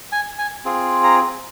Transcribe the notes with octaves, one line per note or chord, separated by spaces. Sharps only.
G#5
G#5
C4 F4 G#4
A#5